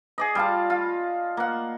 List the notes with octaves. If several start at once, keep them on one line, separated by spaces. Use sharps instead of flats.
G#4 D5 D#5
G3 F4 A5
F4
A#3 F#5